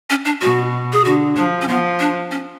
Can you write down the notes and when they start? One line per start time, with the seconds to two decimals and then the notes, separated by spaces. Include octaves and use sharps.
0.10 C#4
0.25 D4
0.41 B2 F#4
0.93 G#4
1.05 D3 F#4
1.36 F3 D4
1.62 C#4
1.68 F3 B3
2.00 D4
2.31 C#4